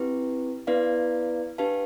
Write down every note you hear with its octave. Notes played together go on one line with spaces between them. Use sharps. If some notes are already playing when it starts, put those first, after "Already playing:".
Already playing: C4 E4 G4 B4
B3 E4 B4 D5 F5
D4 G4 B4 F5 A5